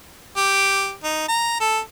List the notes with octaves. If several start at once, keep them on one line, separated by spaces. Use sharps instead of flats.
G4
D#4
A#5
A4